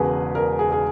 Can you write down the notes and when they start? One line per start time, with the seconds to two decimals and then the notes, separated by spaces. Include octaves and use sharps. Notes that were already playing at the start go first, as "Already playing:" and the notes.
Already playing: E1 E2 C#3 G#4 A#4 B4
0.35 A#4
0.59 G#4
0.72 G#4